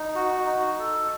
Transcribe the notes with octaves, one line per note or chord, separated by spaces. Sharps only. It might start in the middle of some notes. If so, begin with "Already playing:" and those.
Already playing: D#4
F#4
D#4
A4